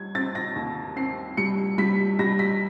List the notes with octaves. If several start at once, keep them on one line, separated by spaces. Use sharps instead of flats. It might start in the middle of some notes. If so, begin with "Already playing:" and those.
Already playing: G3 G#6
C4 A6
A#6
D#2
C4 C7
G3 C#7
G3 B6
G3 A#6
B6